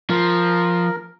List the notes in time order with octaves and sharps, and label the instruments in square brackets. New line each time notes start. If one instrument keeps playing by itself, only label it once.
[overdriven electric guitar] F3 [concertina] A#4